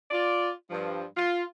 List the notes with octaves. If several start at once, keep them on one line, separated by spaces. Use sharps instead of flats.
F4 D5
G2 F3
F4